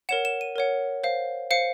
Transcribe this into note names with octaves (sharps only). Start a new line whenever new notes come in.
A#4 C#5 F#5 E7
E7
D#7
A#4 C#5 F#5
C5 F5
C5 F5 C#7